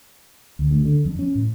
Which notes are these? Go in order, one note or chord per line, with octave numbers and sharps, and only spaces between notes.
D2
D2
D3
F2
C#4
A2